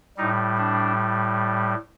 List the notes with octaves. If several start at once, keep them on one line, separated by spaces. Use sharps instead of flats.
A2 G3 D#4
D4